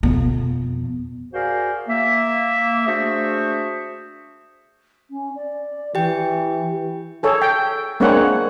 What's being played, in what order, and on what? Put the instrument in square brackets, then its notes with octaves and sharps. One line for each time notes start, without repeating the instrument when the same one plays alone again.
[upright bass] F2 B2
[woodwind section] F#4 G#4 A#4 C5 D5 F5
A#3 E5
A3 D4 F#4 G#4 C5 E5
[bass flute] C#4
D5
[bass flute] E3 [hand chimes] G4 G5
[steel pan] G#4 A4 C#5
G5
G#3 A#3 C4 D4 C#5 F#5